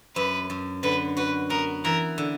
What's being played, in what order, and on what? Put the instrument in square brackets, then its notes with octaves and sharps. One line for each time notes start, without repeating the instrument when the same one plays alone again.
[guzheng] F#2 [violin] B4
[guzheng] F#2
[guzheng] D3 [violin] B4
[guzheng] F#4 [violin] B4
[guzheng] B3 [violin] A#4
[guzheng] E3 [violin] A#4
[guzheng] D3